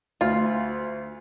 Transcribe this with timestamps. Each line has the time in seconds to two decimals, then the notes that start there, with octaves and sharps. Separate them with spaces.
0.21 D2 F4